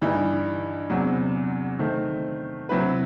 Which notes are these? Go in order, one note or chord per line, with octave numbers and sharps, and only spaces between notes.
G2 E3 G3 D#4
E2 C3 F#3
D#3 A3 C4
C3 F#3 C4 E4 B4